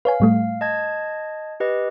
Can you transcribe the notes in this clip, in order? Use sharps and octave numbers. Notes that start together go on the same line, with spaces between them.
B4 C#5 F5 G#5
A2 G3 A3
D#5 A5 G#6
G4 B4 D#5